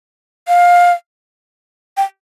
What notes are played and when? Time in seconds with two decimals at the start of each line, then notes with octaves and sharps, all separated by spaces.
0.48 F5
1.97 G5